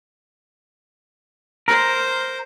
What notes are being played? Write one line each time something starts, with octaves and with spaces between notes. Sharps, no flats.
A#4 C5